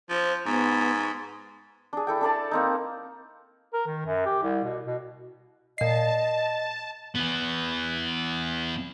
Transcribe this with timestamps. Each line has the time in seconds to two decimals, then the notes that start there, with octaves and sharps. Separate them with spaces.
0.10 F3 C5
0.46 G#2 B3
1.93 D4 G#4
2.07 E4 A4 G5
2.21 D4 A4 D5 A5
2.51 A#3 C4 D#4
3.73 A#4
3.87 D#3
4.06 F#2
4.26 G4
4.43 C2
4.64 B2
4.86 B2
5.78 A#2 D#5 A5 C7
7.15 E3 B3